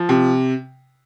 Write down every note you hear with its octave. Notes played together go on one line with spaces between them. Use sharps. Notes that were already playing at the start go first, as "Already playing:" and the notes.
Already playing: F3
C3